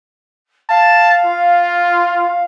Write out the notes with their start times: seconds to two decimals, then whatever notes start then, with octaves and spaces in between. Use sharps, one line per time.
0.69 F5 A5
1.25 F4